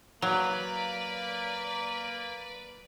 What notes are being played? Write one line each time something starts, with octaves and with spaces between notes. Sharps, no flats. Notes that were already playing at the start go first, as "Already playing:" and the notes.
F#3 A#3 B4 C#5 D5 F5 A#5